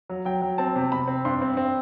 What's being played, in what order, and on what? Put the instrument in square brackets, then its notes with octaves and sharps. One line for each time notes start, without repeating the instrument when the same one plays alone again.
[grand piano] F#3
F#3 G5
F#3
C4 A5
C3
C3 B5
C4
G2 C6
C4
C4